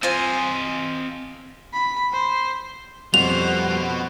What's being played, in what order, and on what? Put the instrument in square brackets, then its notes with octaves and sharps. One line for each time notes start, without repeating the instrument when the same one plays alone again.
[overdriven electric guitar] C4 D#5 [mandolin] F4 C5 G#5
[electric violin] B5
C5
[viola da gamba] F2 C5 [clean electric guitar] G3 C#4 F4 [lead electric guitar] B3 F#4 [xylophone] F7